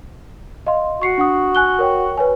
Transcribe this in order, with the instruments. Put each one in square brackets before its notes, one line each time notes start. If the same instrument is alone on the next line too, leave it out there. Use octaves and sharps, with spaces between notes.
[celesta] D#5 F5 C6
[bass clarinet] F#4 [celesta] C#6 C7 C#7
[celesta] D4 F#5 D#6
G#5 F#6 G7
A#4 C#5 G5
B4 C#5 G#5